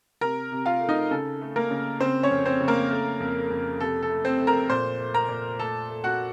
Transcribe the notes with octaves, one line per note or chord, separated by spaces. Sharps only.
C3 A#4 A#5
C3
F4 F5
A3
D#4 D#5
C#3 A4
A3
A#3 A#4
C#3
C#3 C4 C5
C#4 C#5
F2
C4 C5
C#3
A#3 A#4
A3
F2
F2
C3 A4
A4
A3
C4 C5
A3
A#4 A#5
A#2 C5 C6
A3
A#4 A#5
A#2
A3 A4 A5
A3
F#4 F#5